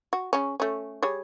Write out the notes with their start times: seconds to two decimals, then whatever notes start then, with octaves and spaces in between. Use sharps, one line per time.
0.13 F#4
0.33 C#3 C#4
0.60 A3 C#4
1.02 G3 G#4 C#5